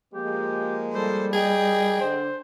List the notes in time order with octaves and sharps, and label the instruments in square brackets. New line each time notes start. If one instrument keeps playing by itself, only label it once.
[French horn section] F3 G#3 A#3 [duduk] G4
[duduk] G3 [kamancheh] A4 C5
[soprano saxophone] G#4 [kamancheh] D#5 G5
[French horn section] D3 D4 [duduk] C5